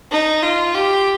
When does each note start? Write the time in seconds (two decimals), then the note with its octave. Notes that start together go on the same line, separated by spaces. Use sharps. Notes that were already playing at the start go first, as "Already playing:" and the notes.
0.11 D#4
0.43 F4
0.75 G4